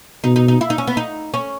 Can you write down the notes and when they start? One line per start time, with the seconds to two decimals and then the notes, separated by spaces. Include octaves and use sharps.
0.24 B2 D#4
0.36 D#4
0.48 D#4
0.61 E4
0.70 D#4
0.78 C#4
0.87 B3
0.97 D#4
1.34 C#4